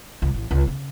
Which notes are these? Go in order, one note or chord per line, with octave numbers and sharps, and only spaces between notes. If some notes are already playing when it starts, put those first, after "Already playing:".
C#2
A1
C#2
C#3